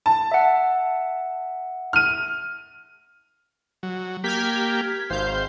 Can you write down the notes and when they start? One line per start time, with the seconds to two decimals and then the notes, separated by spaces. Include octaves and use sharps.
0.06 A5
0.32 E5 F#5
1.93 F6 D#7
3.83 F#3
4.24 A#3 G4 F6 G#6 B6
5.10 G#1 C5 F5 G6